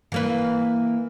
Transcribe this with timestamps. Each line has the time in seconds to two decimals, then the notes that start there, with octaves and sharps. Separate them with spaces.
0.12 E3 A#3 B4